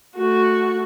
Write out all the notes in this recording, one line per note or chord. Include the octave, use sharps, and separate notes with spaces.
A3 F#4